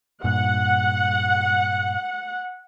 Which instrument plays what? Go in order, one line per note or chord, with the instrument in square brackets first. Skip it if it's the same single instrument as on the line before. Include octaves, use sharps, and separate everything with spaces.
[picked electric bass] G2 A#2 [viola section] F#5